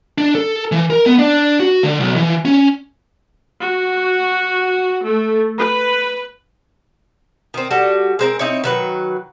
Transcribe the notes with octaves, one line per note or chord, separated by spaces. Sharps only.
D4
A4
E3
A#4
B3
D4
F#4
D3
B1
E3
C#4
F#4
A3
B4
D#3 C4
G3 F#4 A4
G#3 C4 A#4
C4 D#4 E4 C#5
D#3 F#3 B4